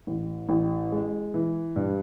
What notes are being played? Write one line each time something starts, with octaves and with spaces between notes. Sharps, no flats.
A1
A1
G#3
E3
G2